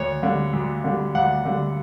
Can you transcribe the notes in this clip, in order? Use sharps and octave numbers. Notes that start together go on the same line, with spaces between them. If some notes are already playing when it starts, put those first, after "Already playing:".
Already playing: D2 C#5
D3 G3
D2
D3 G3
D2 F#5
D3 G3